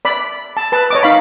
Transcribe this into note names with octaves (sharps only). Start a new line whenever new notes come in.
D5 B5
A5
B4 A5
C#5 D#5 D6
D#4 F5 B5